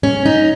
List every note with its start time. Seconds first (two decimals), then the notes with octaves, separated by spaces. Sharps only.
0.03 C#4
0.26 D#4